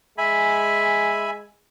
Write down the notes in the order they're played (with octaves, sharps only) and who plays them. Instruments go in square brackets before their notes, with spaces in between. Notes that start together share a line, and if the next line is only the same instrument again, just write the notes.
[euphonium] G#3 [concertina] E5 G#5 B5